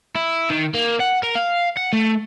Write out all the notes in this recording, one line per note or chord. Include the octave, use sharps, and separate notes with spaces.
E4
D#3
A#3
F#5
A#4
F5
F#5
A3